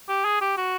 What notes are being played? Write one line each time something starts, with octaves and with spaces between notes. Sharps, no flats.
G4
G#4
G4
F#4